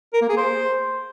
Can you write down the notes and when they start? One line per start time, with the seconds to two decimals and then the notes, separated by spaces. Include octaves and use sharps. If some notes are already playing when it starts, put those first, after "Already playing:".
0.14 A#4
0.21 A#3
0.29 G#4
0.37 C5